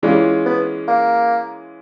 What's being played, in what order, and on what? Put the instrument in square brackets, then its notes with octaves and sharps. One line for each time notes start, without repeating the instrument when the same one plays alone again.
[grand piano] E3 G#3 C#4 F4 [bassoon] G3
[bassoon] B3
A#3